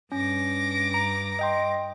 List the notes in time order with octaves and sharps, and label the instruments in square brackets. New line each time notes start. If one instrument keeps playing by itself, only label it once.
[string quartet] G2 D6 A#6 [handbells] C#4
[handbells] A#5
D#5 G5 C6